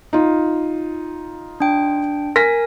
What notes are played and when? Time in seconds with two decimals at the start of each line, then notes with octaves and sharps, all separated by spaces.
0.13 D#4 F4
1.60 D4 G5
2.36 A#4 G#5 A#6 B6